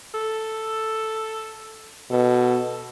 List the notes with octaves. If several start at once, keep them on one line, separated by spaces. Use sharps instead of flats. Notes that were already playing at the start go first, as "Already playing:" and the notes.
A4
B2 A4